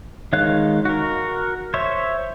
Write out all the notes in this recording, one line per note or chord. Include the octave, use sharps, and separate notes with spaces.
D#3 G#3 C#5 F5 F#6
F#4 A#4
C5 C#5 E5